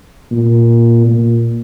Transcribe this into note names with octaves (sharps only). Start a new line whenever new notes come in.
A#2
A#2